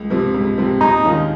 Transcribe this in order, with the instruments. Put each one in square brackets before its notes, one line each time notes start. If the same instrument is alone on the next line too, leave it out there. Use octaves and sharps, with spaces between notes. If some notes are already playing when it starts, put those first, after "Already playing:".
Already playing: [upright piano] C#2
C3 F3 C4
C#2
C3 F3 C4
[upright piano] D#2 [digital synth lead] D#4
[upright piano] D#3 G#3 C#4 F4